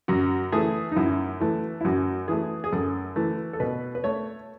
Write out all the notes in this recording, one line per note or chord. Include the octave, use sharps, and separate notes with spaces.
F#2 F#4
E3 A3 G#4
D#4
F#2 E4
E3 A3
E4
F#2 F#4
E3 A3 G#4
G#4
F#2 A4
E3 A3
A4
B2 B4
B4
A3 C#5